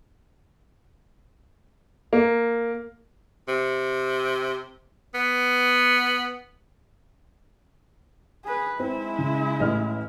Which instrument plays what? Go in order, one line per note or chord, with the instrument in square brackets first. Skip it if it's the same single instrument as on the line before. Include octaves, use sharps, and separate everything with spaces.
[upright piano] A#3
[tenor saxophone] C3
B3
[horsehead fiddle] G#4 B4
[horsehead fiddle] G#3 E4 [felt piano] C4
[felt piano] C#3
A1 D#5 F6